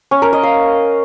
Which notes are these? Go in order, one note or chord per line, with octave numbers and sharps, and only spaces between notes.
C#4
A#4
D#5
F5